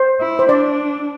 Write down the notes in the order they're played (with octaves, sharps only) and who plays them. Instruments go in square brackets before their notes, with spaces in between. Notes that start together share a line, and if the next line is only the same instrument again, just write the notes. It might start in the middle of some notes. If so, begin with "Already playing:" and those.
Already playing: [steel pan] C5
[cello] E4
[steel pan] C5
[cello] D4 [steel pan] D5